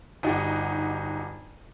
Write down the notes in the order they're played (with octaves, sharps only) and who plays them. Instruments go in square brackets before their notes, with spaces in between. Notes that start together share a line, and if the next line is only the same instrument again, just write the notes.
[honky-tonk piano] G1 D#4 F#4 G4